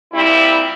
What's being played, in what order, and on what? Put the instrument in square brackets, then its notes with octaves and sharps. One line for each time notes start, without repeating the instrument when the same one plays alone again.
[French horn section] A#2 G3 C4 E4